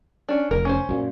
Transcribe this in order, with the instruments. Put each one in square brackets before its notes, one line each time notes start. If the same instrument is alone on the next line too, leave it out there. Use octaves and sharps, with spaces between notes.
[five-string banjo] C#4 D4
[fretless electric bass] F1 [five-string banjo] A#4
[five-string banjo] C#4 C5
[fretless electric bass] F#2 A#2